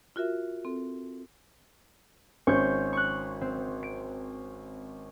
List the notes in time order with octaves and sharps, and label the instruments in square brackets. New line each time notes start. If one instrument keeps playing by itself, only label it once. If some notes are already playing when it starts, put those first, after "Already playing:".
[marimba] F4 F#4 A#4 E5
C4 A4
[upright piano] G#1 C#4 C5 [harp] C#6 G6
[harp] C#6 F#6
C4
D7